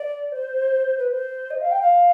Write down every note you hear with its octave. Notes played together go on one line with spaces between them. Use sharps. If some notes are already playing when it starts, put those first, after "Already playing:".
Already playing: D5
C5
B4
C5
D#5
F5
G5
F5